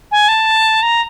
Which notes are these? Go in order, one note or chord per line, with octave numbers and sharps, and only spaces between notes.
G#5
A5
A#5